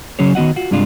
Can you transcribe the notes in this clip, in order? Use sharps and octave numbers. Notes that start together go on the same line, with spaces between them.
C#3 F#3 C#4 G#4 C#5
D#3 B3 F#4 D#5 F#5
F4 F#4
G2 C3 G#3 D4 F4